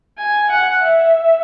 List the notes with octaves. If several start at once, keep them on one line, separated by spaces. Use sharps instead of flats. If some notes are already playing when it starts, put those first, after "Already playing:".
G#5
F#5
E5